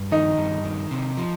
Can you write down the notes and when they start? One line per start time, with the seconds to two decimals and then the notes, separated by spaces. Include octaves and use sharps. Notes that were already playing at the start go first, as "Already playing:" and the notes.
Already playing: G2
0.12 D#3 D#4
0.38 G2
0.64 D#3
0.91 C3
1.17 F3